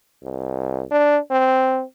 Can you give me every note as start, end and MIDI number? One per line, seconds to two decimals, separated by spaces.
0.23 0.84 36
0.91 1.18 62
1.31 1.83 60